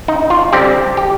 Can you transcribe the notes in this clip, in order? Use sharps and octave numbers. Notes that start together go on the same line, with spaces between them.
D#4
F4
D3 G3 C4 G4
G4